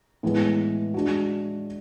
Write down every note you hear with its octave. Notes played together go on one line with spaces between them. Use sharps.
A2 E3 G#3 B3
G#3 D4 F#4